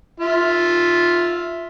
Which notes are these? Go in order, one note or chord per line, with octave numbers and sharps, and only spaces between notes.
F4 E5